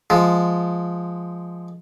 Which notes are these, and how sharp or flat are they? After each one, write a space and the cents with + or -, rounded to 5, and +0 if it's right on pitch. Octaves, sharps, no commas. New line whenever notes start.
F3 +0 G#3 +0